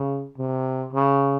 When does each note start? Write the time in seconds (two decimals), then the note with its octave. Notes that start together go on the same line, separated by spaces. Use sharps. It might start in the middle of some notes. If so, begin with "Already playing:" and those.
Already playing: C#3
0.38 C3
0.93 C#3